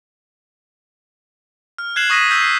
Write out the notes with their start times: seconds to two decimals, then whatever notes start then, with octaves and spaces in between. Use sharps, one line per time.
1.78 F6
1.96 F#6 G#6 C7 E7 F#7
2.10 C#6 D#6 A#6 B6 D#7
2.30 E6 G6 B6
2.42 C7